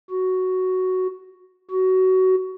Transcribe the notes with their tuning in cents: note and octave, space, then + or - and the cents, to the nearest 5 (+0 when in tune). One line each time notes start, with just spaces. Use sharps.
F#4 +5
F#4 +20